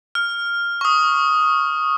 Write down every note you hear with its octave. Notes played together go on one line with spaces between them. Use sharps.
F6
C#6
D#6